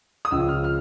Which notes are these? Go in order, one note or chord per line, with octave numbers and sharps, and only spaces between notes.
D#6
C#2 C#3 F3 E6
F6
F6